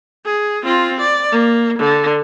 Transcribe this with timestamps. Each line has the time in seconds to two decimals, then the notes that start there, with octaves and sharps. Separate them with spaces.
0.25 G#4
0.64 C4 F4
1.00 D5
1.32 A#3
1.79 D3